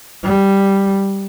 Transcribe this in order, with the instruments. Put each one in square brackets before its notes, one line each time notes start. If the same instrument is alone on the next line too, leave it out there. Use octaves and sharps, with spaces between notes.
[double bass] G3